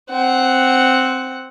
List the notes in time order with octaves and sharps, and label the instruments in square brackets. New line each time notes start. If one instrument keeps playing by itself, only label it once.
[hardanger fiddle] C4 F#5